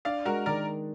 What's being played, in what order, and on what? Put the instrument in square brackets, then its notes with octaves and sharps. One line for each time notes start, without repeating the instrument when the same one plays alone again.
[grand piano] D4 [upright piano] D5 F5
[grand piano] G#3 [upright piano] F#4 A#4
[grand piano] D#3 [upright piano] A#4 D5